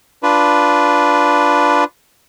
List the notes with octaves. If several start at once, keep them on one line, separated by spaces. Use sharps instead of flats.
D4 F4 B4